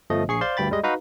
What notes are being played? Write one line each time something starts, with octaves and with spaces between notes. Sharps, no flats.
G1 F3 A3 D#5
A#1 G#4 C#6 C7
C5 D5 F5 C6
D2 G2 G5 B5 A6
G3 G#3 D#5
D#4 F#4 B4 F5 A#5